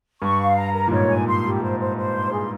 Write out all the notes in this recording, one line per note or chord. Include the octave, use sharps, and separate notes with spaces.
G2 C#6
F5
A#5
A#4
A#2
G#2 C#5
G#5
C6
G4
C5
C5
C5
C6
G#4